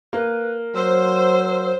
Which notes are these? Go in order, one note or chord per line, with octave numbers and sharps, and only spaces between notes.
A#3 B4
F#3 C5 E6